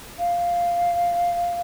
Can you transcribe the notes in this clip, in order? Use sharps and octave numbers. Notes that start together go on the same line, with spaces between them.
F5